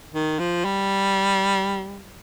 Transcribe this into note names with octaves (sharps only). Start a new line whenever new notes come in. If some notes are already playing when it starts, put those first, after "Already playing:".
D#3
F3
G3